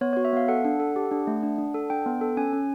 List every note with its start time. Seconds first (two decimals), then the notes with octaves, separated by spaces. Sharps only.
0.01 B3 C#5
0.13 F#4 C#5
0.25 E5
0.33 B3 F5
0.48 A4 F#5
0.65 D4
0.80 A4
0.96 G4
1.11 D4
1.27 A3
1.43 D4
1.58 D4
1.74 A4
1.90 D4 G5
2.06 B3
2.21 A4
2.37 C#4 G#5
2.53 C#4